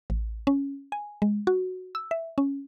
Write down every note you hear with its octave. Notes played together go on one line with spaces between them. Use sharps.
A1
C#4
G#5
G#3
F#4
E6
E5
C#4